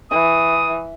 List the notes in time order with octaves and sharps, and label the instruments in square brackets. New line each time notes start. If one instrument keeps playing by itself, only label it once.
[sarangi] E3 [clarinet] D#6